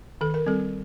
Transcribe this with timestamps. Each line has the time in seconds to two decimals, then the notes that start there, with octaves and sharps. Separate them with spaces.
0.21 D#3 A4
0.34 A#4
0.46 G3 C4 A4